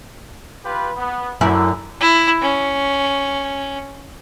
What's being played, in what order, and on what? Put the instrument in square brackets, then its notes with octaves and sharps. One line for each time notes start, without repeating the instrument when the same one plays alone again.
[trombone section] F4 G4 B4
B3
[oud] F#2 E4 [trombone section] D3
[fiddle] E4
C#4